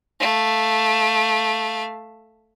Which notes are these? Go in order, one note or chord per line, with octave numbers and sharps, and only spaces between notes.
A3 F5